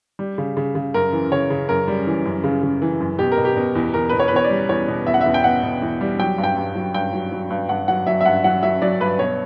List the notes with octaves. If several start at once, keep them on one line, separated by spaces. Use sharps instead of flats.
G3
C#3
C#3
C#3
F#2 A#4
E3
C#3 C#5
C#3
F#2 A#4
G3
E3
F#2
C#3
C#3
E3
F#2
B2 G4
A#4
B2
G4
B2
E2
E2 A#4
B2 B4
C#5
B4
E2 C#5
D5
G3
E2 C#5
B2
E2 E5
F#5
E2 E5
G5
B2 F#5
B2
E2
G3
F#3 G5
G2
G5
G2
F#3
G2 G5
F#3
F#3
G2
G2 F#5
F#3 F#5
F#3 E5
E5
G2 F#5
F#3 F#5
F#3 E5
F#3 D5
G2 B4
B2 C#5